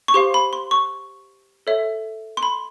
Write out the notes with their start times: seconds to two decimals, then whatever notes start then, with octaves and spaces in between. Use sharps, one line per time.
0.08 C#6
0.14 G4 C5 F5 C6
0.34 B5
0.53 C6
0.71 C#6
1.67 A4 C#5 E5
2.37 C6
2.43 B5